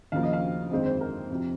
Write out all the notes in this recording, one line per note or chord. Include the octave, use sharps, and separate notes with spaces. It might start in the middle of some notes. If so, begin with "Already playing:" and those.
D#2 C#3 F3 A#3 F5
D#5
F5
G1 F2 D#3 G#3 C4 D#5
C5
A#4
F2 C3 F3